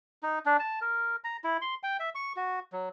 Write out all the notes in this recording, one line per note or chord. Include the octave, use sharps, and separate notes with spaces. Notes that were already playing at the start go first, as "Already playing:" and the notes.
D#4
D4
A5
A#4
A#5
E4
C6
G5
E5
C#6
F#4
F#3